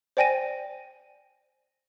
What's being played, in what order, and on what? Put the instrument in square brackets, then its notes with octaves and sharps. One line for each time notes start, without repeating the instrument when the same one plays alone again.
[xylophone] C5 D5 G5 G#5 A#6 D#7